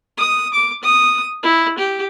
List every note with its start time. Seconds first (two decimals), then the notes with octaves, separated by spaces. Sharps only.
0.18 D#6
0.53 D6
0.83 D#6
1.43 E4
1.78 G4